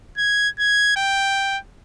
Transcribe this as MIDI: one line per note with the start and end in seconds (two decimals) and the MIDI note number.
0.17 0.49 92
0.59 0.95 92
0.96 1.58 79